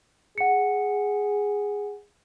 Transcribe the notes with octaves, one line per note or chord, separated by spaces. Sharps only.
G#4 F#5 C#7